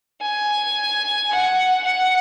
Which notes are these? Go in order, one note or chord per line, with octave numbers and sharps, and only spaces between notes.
G#5
F#5
F#5